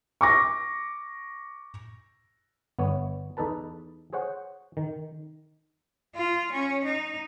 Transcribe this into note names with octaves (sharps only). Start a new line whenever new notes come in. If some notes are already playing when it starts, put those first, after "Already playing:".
C#6 D6 A#6
G1 B3 C#5
E2 D#4 A4 B4 A5
G#4 C5 C#5 F#5
D#3
F4
C#4
D#4